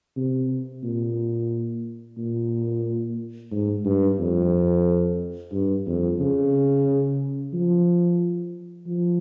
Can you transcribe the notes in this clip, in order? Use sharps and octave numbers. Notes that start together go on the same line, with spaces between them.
C3
A#2
A#2
G#2
G2
F2
G2
F2
C#3
F3
F3